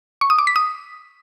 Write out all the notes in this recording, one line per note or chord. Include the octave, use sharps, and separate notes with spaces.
C#6
D#6
D6
B6
D#6